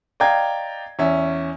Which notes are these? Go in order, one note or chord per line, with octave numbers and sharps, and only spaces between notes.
D5 D#5 F5 G5 A#5 G#6
E2 C#4 E5